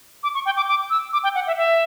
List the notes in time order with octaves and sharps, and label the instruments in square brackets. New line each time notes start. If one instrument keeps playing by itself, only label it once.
[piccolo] D6
C#6
G5
D6
D6
E6
D6
G5
F#5
E5
E5